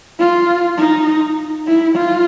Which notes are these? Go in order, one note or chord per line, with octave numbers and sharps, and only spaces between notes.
F4
D#4
E4
F4